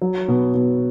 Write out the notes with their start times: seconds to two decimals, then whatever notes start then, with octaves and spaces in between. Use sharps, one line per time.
0.02 F#3
0.28 B2
0.54 B2